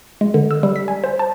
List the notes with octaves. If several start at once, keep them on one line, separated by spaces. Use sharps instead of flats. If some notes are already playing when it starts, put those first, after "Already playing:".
G#3
D3
E6
G3
B6
G#5
C5
A5